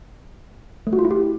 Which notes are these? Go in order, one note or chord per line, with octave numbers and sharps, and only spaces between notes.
A3
F#4
F4
E4
G4